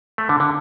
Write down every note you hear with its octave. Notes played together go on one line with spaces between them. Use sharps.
A3
D3
D3